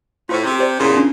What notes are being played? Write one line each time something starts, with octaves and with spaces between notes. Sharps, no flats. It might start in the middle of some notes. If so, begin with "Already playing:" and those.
A2 F4 C5 C#6
C3
G4 C5 D5
E2 A#2 C#3
C#4 D4 F4